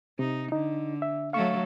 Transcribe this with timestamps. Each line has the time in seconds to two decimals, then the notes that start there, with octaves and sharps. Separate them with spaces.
0.19 C3 D#4
0.52 D3 D#4
1.02 E5
1.33 F#3 A3 A4 F5 C#6